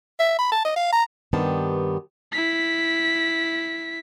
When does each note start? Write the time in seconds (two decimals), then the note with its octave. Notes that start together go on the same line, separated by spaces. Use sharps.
0.19 E5
0.39 B5
0.52 A5
0.65 D#5
0.76 F5
0.93 A#5
1.33 G2 D#3 B3 C4 G4 A5
2.32 E4 B6